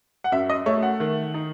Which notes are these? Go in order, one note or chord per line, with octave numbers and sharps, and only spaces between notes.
F#5
F#2 E5
D#5
A3 C#5
F#5
D#3
D#4